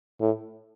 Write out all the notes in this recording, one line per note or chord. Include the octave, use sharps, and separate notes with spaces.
A2